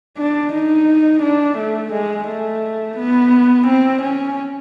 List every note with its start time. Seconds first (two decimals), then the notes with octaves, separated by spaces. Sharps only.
0.18 D4
0.53 D#4
1.23 D4
1.58 A3
1.93 G#3
2.28 A3
2.98 B3
3.67 C4
4.03 C#4